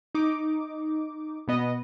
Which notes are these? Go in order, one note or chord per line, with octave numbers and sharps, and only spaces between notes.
D#4 D6
B2 B3 D#5